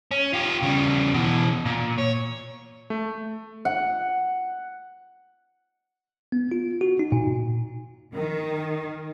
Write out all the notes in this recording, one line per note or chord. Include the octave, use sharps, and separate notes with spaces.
C#4
F4 G4
C#3 G3
B2 E3
A#2
C#5
A3
F#5
B3
F4
F#4
D#4
A#2
D#3 A#4